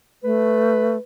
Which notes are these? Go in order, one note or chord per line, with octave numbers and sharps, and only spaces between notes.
A3 B4